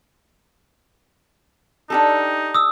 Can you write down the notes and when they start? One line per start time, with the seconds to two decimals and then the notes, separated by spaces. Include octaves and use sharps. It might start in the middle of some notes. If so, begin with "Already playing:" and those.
1.90 D4 D#4 G4 A4
2.55 D#6 E6